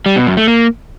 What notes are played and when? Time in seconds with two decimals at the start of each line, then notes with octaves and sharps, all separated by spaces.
0.06 G3
0.16 B2
0.27 F#2
0.37 A3
0.48 A#3